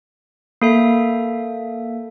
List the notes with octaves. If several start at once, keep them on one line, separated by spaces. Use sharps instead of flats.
A#3 A4 E5